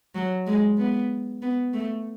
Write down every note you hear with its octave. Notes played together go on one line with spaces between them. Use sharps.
F#3
G#3
B3
B3
A3